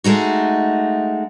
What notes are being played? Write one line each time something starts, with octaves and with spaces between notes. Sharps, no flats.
G#3 A3 D#4 F#4